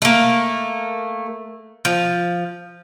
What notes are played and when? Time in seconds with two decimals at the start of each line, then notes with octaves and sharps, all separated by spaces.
0.02 A3 A#3
1.85 F3